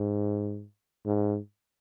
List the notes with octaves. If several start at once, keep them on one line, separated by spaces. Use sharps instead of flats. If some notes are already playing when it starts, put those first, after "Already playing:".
Already playing: G#2
G#2